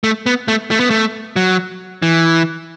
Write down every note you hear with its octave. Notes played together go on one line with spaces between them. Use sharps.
A3
B3
A3
A3
B3
A3
F#3
E3